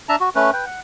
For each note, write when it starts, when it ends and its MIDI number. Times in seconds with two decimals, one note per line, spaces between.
0.09 0.16 62
0.09 0.16 76
0.09 0.16 81
0.09 0.16 82
0.20 0.29 66
0.35 0.51 57
0.35 0.51 61
0.35 0.51 71
0.53 0.65 71
0.53 0.65 79
0.66 0.81 78